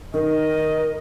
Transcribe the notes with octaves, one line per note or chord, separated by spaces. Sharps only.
D#3 A#4 D#5